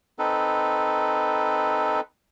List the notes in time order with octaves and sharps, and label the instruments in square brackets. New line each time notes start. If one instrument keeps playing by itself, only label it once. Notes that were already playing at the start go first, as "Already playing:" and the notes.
[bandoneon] C4 D#4 A4 B4